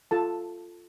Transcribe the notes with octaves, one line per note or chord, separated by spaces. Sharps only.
F4 A4 A5